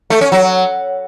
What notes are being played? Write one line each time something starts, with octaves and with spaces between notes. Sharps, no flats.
A3
C#4
F#3